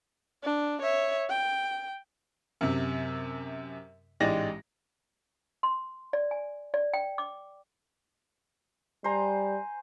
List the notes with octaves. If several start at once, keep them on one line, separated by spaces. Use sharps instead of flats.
D4
C#5 E5
G5
F#2 C3
A1 G#2 G#3 G4 D5 A#6
C6
D5
G#5
D5
G5
D6
G3 C5 G#5 A#5